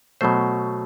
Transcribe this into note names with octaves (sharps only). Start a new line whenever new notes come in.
B2 F#3 A3 C5